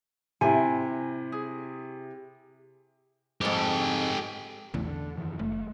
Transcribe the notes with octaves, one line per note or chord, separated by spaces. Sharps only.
C3 E4 G#5
G#4
F2 G#2 G4 A4
A#1 E2 C#3 A3
D3
F#2 D#3 E3
F#1 G#3 A3